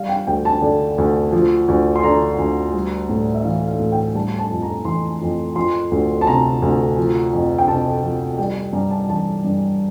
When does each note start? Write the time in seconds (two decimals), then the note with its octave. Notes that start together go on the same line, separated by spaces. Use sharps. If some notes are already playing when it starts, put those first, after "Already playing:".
Already playing: G3 F5
0.09 G5
0.27 D2 G5
0.45 A5
0.62 D3
0.98 D2
1.33 F3
1.68 D2
1.96 C6
2.03 D3 A#5
2.38 D2
2.73 G3
3.09 A2
3.35 E5
3.44 E3 F5
3.67 F5
3.80 A2
3.92 G5
4.15 G3 A5
4.39 A5
4.50 F2
4.62 A#5
4.85 E3 C6
5.21 F2
5.56 F3 C6
5.92 D2
6.21 A5
6.27 C3 A#5
6.62 D2
6.98 F3
7.33 F2
7.59 G5
7.68 C3 A5
8.03 F2
8.38 G3 G5
8.73 G2 A#5
8.91 A5
9.08 E3 A5
9.44 G2